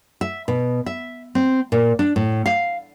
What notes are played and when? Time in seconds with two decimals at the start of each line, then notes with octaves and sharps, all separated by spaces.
0.21 E5
0.48 B2
0.86 E5
1.35 C4
1.72 A#2
1.99 D4
2.16 A2
2.46 F5